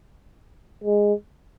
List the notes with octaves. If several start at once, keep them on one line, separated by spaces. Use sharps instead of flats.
G#3